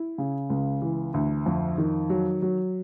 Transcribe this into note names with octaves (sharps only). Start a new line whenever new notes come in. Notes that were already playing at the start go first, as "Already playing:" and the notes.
Already playing: E4
C#3
C#2
E3
D2
F2
D#3
F#3
F#3